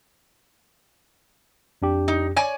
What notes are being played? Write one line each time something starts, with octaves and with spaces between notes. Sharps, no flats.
F2 D4 G4
D#4
C#5 D5 G#5